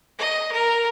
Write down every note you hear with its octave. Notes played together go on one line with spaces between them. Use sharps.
D#5
A#4